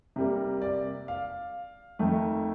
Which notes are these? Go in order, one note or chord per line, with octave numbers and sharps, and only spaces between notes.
C3 G3 A#3
D5
F5
F2 D#3 A3